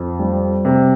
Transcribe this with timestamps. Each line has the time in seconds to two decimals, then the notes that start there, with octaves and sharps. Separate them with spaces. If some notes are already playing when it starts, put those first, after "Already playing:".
Already playing: F2
0.19 G3
0.65 C3